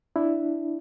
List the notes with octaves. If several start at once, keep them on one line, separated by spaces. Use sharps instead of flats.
D4 E4